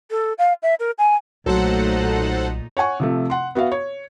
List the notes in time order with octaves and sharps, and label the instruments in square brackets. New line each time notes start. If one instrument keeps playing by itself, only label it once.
[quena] A4
F5
E5
A#4
G#5
[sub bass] B1 [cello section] A#2 A3 D#4 [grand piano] F#3 [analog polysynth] A4 C5 F#5
[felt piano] C#5 F#5 G#5 C#6
C3 F3 A3
F#5 C6
B3 F#4 E5 F5
C#5